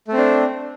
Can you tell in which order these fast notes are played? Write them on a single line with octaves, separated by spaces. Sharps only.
A3 C4 D4